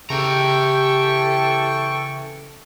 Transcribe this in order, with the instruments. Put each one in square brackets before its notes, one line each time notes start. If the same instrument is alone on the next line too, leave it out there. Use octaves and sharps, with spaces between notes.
[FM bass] C#3 [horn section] E3 A4 [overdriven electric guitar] G4 A#5 [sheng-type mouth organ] G5 C#6